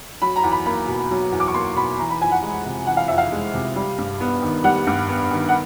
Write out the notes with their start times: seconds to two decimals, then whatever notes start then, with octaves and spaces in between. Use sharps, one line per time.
0.22 F#3 B5
0.36 A#5
0.43 E2
0.52 B5
0.66 A#3 B5
0.88 B2
1.11 F#3
1.32 E2
1.40 D6
1.48 C#6
1.54 A#3 C6
1.76 B2 B5
1.98 E3 A#5
2.10 B5
2.21 F2 G#5
2.31 F#5
2.42 G#3
2.66 C3
2.87 E3 F#5
2.97 F5
3.08 F2 E5
3.18 F5
3.32 G#3
3.54 C3
3.76 G3
3.98 G2
4.20 B3
4.42 D#3
4.64 G3 F#5
4.87 G2
5.08 B3
5.31 D#3
5.49 F#5